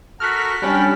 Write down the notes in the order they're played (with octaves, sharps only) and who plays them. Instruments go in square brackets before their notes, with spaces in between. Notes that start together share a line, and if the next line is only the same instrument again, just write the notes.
[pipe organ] F#4 A4 A#4 [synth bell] F6 F#6 B6
[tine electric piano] G3 C#4 D4 [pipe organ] G5 A5 B5